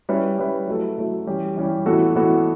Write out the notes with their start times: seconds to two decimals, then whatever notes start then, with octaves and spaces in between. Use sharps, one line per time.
0.09 G3 C#4 E4 B4
0.38 G3 C#4 E4 B4
0.68 F#3 A3 E4 A4
0.97 F#3 A3 E4 A4
1.27 E3 G3 C#4 G4
1.57 E3 G3 C#4 G4
1.86 A2 E3 B3 F#4 A4
2.15 A2 E3 B3 F#4 A4